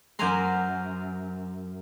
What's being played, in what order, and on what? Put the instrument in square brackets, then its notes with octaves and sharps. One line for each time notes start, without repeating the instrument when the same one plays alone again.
[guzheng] F#2 A#4 C5 G#5 A#5 C6